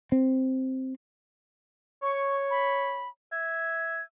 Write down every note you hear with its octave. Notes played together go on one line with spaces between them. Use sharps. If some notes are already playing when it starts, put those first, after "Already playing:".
C4
C#5 C#6
B5
E5 G#6